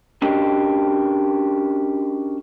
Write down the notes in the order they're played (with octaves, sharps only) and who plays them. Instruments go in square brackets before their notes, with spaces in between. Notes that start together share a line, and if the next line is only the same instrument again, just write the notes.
[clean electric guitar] C#4 D4 F#4 G4 A#4 D#5